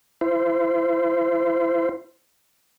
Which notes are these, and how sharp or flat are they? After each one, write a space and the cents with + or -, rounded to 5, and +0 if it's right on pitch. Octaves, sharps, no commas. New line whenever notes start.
E4 +35 C5 -20